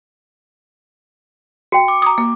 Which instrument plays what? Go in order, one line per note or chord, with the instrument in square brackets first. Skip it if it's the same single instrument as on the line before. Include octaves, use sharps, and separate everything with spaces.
[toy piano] F#4 G5 [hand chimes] C#7
[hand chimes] D6
[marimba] A#5 D#6
A#3